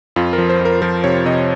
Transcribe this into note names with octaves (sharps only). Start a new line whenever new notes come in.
F2 F4
A#4
F3
C5
F2
A#4
F3 A#4
C3 C#5
C3 D#5